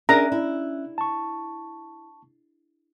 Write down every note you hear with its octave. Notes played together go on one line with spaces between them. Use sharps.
C#4 D4 G#4 A#4 E5 A#5 F#6
E4
A5 C#6